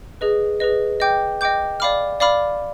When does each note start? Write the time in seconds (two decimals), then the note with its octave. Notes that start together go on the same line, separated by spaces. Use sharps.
0.21 G#4 B4 D#5
0.60 G#4 B4 D#5
1.00 D#5 G5 D6 G6
1.41 D#5 G5 D6 G6
1.80 D5 F5 B5 D6 F6
2.20 D5 F5 B5 D6 F6